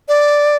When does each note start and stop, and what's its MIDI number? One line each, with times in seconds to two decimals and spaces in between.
0.08 0.56 74